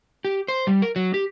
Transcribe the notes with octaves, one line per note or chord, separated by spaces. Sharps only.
G4
C5
G3
A#4
F#3
G4